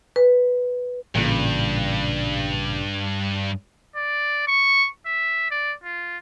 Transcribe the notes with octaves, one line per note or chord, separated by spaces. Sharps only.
B4
A1 G2 A#2 C#3
D5
C#6
E5
D5
F4